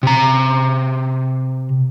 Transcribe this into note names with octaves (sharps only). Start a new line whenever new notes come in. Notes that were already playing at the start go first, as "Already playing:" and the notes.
C3 A#5